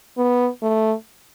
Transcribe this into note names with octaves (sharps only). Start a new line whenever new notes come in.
B3
A3